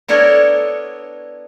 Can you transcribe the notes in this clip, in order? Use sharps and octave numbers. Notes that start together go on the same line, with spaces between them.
B3 D4 E4 A4 A#4 C#5